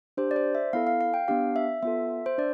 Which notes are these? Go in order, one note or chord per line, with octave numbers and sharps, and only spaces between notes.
D4 G4 C5
D5
C5
E5
B3 E4 A4 F5
F5
F5
G5
B3 D4 G4 F5
E5
B3 F4 A4 E5
C5
D4 D5